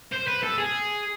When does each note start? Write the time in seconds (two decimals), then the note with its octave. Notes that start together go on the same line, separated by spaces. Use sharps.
0.13 C5
0.28 B4
0.43 A4
0.58 G#4